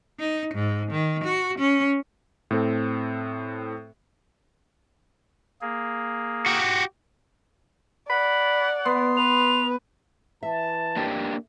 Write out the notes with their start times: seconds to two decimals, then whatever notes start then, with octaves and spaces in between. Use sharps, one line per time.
0.19 D#4
0.54 G#2
0.91 D#3
1.24 F#4
1.59 C#4
2.51 A2 C4 A4
5.61 A#3 G#4
6.46 F#4 G4
8.10 D5 F#5 B5
8.85 B3 C6
9.17 B4 F7
10.43 E3 E5 A5
10.96 F2 A#3 D4 G4